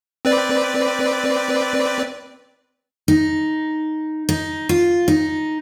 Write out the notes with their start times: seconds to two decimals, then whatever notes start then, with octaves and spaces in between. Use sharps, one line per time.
0.25 C4 B4 D5
3.08 D#4
4.29 D#4
4.69 F4
5.08 D#4